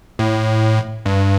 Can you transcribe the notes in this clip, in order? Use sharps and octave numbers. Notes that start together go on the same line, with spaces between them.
A2
G2